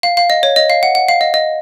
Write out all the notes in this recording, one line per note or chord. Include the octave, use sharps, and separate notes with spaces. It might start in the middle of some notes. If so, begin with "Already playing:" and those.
F5
F5
D#5
C#5
D#5
F5
F#5
F#5
F5
D#5
D#5